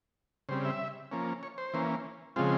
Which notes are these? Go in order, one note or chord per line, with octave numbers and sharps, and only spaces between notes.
C#3 G3 C4 C5
E5
F3 A#3 C#4
C#5
C5
E3 A#3 C#4
C#3 F3 G#3 C4 F4